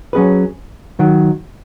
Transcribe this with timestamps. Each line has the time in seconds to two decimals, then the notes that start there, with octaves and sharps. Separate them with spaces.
0.13 F#3 C#4 G#4 B4
0.99 D#3 F#3